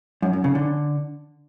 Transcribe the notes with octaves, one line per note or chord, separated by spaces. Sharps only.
F#2
F#2
C#3
D3